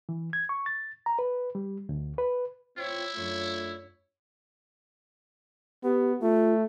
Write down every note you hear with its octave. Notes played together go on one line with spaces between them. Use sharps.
E3
G#6
C#6
A6
A#5
B4
G3
D2
B4
C4 E4 F4 C#5
F#2 A3 D4 F4 C#5
B3 G4
A3 F4